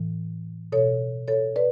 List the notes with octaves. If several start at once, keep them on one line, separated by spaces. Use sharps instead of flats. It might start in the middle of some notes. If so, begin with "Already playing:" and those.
Already playing: A2 E3
B2 A4 C#5
A4 C#5
B4 D5